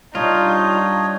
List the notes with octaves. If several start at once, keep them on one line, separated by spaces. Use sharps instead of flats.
G3 D4 D#4 F4 C#5 D#5